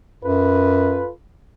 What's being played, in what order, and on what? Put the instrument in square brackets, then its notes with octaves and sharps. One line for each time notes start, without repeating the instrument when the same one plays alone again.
[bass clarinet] F#2 [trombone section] F4 A4 B4